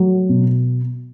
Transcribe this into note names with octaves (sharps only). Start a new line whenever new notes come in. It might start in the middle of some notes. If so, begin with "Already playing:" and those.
Already playing: F#3 A3
B2